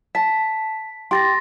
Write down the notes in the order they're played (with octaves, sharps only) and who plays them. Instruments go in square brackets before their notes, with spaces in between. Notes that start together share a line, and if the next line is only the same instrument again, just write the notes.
[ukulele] A5 [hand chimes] B6
[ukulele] G4 [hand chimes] C6 A6 A#6